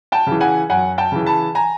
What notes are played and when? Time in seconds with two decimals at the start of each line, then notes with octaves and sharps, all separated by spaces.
0.12 G5 A5
0.27 C#3 E3
0.40 F#5 G#5
0.69 F#2 F#5 G#5
0.98 G5 A5
1.12 C#3 E3
1.26 A5 B5
1.55 G#5 A#5